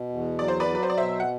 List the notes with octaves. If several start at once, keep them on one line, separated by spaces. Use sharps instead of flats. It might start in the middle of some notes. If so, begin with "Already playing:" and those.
Already playing: B2
E2
F#3 D5
C5
B4 D5
F#3
B4
C5
D5
B2 C5 E5
F#5